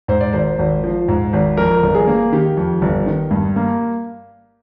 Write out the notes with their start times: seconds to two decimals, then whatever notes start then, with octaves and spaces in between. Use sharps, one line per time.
0.08 G#2 C5
0.21 D5
0.33 G#1 C5
0.59 G#1
0.84 F3
1.08 G#2
1.33 G#1
1.57 F2 A#4
1.83 G1
1.95 G#4
2.07 A#3
2.32 D#3 G4
2.57 F2
2.82 G1
3.06 D#3
3.31 G2
3.56 A#3